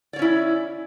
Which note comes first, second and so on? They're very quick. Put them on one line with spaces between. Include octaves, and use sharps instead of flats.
D5 C#5 C#4 E4